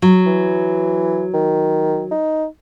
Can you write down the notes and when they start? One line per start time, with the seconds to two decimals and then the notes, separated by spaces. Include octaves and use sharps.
0.02 F#3
0.26 E3
1.34 D#3
2.11 D#4